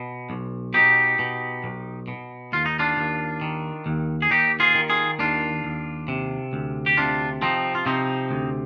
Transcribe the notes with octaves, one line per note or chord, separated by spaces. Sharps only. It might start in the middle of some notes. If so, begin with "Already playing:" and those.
Already playing: B2
B1
B2 D#4 G4
B2
B1
B2
D#2 F4
D#4
D4 F4
D#2
D#3
D#2
G#4
D#2 D#4 G4
F4 G#4
D#3
F4 G#4
D#2 D4 F4
D#2
C3
D2
G4
C3 D4 F4
F3 C4 D#4
F4
C3 C4 D#4
D2